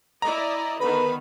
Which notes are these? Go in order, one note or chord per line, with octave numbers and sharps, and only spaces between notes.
E4 D5 D#5 A#5
D3 D#3 B3 B4 B5